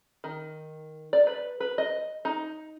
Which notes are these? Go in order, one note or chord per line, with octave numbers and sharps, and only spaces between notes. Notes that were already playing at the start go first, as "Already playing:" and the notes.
D#3
D5
B4
B4
D#5
D#4